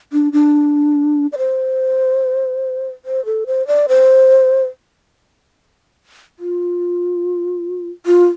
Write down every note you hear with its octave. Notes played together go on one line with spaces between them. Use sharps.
D4
D4
D5
C5
C5
A4
C5
D5
C5
F4
F4